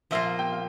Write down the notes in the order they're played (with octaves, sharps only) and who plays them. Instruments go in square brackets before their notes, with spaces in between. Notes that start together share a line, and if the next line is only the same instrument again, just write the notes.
[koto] A#2 F3 A#3 F4 [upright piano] E5
[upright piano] F5
G5
F5